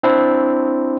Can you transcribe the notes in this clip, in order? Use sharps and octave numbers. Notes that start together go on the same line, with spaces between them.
C4 D4 E4